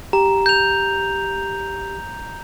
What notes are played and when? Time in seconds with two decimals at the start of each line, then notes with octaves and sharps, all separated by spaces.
0.13 G4 A#5
0.46 G6 F7